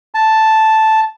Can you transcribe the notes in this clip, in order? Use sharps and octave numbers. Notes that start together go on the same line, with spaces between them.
A5